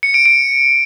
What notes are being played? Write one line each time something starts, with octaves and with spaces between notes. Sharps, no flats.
C#7
D7
D7